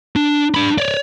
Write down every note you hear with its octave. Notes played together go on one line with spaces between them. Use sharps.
D4
D4 B5
C#5 D5